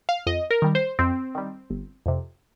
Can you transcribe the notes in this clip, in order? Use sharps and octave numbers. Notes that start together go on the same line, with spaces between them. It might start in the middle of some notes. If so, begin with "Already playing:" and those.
F5
F2 D#5
A#4
D#3 G3
C5
F2 C4
D#3 G3
G1
F2 C3